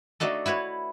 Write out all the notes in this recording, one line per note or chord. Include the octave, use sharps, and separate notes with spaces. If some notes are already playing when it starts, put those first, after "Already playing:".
A3 D4 D#4 F#4 A4
E4 F#4 B4 C#5